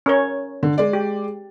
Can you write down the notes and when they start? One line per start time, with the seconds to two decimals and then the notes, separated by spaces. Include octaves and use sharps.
0.06 C#4 A#4 C#5
0.63 D3
0.78 G#3 D5
0.93 G4